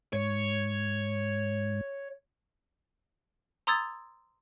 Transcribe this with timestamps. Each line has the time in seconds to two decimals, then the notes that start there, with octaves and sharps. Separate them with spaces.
0.13 G#2 C#5
3.67 A#5 C6 D#6 E6 G#6 A6